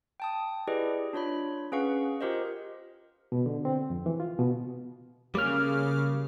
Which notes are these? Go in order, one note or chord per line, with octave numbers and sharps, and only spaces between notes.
G5 A5 D#6
E4 G4 G#4 B4 D5 D#5
D4 F4 C#5 B5
C#4 G#4 B4 F5 F#5 C#6
F4 G4 A#4 C5 D#5
B2
D3
C4
F2
E3
F4
B2
C#3 G3 A#3 D6 F6